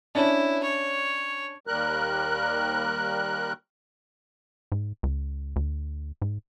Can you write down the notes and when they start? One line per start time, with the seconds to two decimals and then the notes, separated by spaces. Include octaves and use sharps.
0.15 C#4 D4 E4
0.63 C#5
1.67 D#2 G3 A#4 F#6
4.72 G#2
5.03 C#2
5.56 D2
6.22 G#2